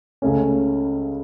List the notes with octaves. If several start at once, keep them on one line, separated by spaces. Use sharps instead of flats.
C#2 C#3 A3 C#4